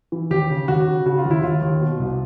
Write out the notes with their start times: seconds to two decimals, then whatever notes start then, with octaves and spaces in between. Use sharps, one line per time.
0.12 E3
0.30 D#2 G4
0.50 C#3
0.68 D#2 F#4
0.87 C#3
1.06 C#3 F#4
1.18 F4
1.25 D#2
1.31 E4
1.43 D#2 F4
1.62 D#2
1.81 B2
2.00 C2